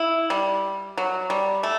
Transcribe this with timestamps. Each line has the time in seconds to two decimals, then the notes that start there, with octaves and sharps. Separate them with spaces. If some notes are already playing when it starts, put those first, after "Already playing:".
Already playing: E4
0.30 G3
0.98 F#3
1.30 G3
1.63 A3